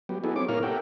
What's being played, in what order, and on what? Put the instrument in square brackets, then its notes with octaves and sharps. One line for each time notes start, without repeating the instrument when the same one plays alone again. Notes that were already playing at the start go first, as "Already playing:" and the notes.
[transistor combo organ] F#3 B3 G4
B3 D#4 E4 F#4 G#4 A4
C4 C#5 D6
A#2 E4 A#4 C#5 F5 F6
G4 A4 A#4 E5 F#5 G5